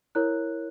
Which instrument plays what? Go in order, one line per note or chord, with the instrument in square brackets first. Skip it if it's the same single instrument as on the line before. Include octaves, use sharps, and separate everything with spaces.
[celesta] E4 A#4 C#5 F#6